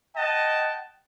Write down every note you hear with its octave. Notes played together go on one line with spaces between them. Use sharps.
D#5 F#5 G5 A5